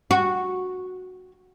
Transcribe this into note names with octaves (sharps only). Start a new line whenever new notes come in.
F#4